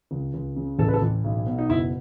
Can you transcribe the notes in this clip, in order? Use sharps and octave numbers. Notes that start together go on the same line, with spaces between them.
C#2
C#2
C#3
A1 A4
B4
A4
A1
B1
B2
D#4
F#1 E4